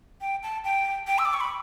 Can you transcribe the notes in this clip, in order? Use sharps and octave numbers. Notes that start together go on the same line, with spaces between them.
G5
A5
G5
G5
E6
D6
C#6
B5